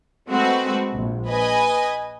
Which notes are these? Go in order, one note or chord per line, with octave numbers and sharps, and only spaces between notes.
G#3 A3 C4 F#4 B4
A#1
B4 D#5 G#5